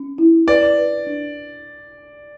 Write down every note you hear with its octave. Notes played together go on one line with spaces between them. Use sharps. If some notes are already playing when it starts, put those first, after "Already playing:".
Already playing: C#4
E4
B4 D5
B4
D4